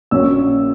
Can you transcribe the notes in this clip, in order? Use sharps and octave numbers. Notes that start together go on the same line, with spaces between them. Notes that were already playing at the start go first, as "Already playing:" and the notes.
A#1 A#2 F#3 C#4 E6